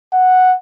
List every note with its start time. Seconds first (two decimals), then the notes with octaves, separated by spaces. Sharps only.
0.13 F#5